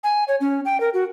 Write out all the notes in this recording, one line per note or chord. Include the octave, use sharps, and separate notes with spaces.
G#5
C#5
C#4
G5
A#4
F#4